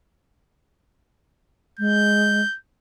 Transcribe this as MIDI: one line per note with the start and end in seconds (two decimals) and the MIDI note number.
1.79 2.41 56
1.79 2.57 91